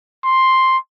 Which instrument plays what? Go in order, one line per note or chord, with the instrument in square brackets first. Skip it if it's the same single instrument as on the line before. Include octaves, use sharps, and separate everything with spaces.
[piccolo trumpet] C6